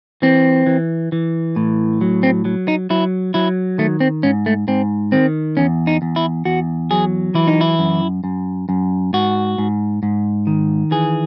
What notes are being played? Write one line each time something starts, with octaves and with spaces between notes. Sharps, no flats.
E3 C4
E3
E3
A2
F#3
C4
F#3
D#4
F#3 E4
F#3 E4
D#3 A3
C4
G#2 C#4
A3
G#2 C4
D#3 C4
E2 C#4
D#4
E2
E4
E2 F#4
F#3 G#4
E3 E4
D#4
E4
F#2
F#2
F#2
G#2 F#4
G#2
G#2
D#3
E3 G#4